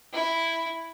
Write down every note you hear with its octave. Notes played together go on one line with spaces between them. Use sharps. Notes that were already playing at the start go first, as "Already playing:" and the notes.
E4